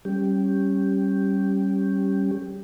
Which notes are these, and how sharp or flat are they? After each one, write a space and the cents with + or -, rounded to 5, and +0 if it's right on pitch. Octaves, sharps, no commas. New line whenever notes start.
G3 -15 C#4 -10 G4 +0